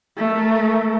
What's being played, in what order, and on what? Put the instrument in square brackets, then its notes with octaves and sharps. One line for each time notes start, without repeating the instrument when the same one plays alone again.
[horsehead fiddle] A3 A#4